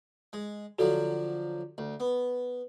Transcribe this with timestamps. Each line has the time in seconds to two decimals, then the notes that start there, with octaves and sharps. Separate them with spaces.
0.33 G#3
0.79 D3 F3 F#3 F#4 A4
1.78 D2
2.00 B3